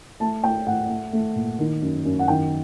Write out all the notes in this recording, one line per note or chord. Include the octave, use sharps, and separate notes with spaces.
A3 A5
A3 G5
A2 F#5
A3
A3
A#2
D#3
F#2
F#2
F#5
D#3 G5